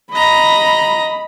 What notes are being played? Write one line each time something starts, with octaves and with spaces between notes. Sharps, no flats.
D#5 A#5 B5